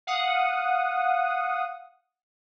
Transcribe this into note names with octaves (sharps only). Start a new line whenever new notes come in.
F5 F#5 D#6